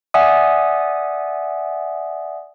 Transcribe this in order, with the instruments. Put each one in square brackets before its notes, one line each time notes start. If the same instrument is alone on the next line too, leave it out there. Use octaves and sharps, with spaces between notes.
[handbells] D5 E5 F#5 G#5 D#6